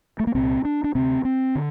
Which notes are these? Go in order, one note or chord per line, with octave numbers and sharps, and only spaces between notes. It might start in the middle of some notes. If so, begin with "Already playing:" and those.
A3
A#3
C2 A#2 C4
D4
D4
D2 C3 C4
C4
D3